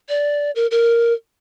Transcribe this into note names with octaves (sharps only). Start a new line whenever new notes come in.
D5
A#4
A#4